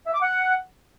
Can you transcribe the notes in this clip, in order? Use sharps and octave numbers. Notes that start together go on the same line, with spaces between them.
E5
D6
F#5